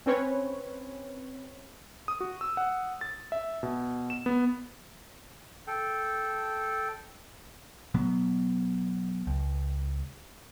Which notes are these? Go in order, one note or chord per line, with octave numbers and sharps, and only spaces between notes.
C4 C#4 B4 C#5
D#6
F#4
E6
F#5
A6
E5
B2
E7
B3
A4 G5
B2 F#3 B3
C#2